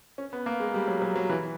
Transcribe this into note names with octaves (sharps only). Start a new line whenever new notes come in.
C#4
B3
A#3
G#3
G3
F#3
F#3
F#3
E3